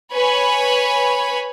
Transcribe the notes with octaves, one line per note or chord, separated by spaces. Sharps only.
B4 C#5 G#5 B5